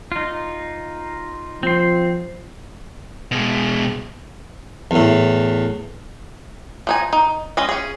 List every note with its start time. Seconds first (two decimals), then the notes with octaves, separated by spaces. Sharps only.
0.12 D#4 F4
1.63 F3 C4 C6
3.31 B2 G#3
4.91 E2 A2
6.87 F3 D#4 G#5
7.13 D#4
7.57 G#3 C#4 D#5
7.69 C#4 G#4